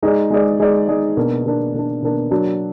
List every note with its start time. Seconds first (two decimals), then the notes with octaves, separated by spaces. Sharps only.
0.03 G#3 D#4 G#4 D5
0.30 G#3 D#4 G#4 D5
0.60 G#3 D#4 G#4 D5
0.87 G#3 D#4 G#4 D5
1.17 B2 A#3 D4
1.45 B2 A#3 D4
1.74 B2 A#3 D4
2.02 B2 A#3 D4
2.31 F#3 A#3 D4 F#4